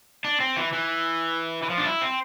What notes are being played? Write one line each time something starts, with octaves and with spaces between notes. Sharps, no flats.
D4
C4
E3
E3
E3
F3
D4
E4
C4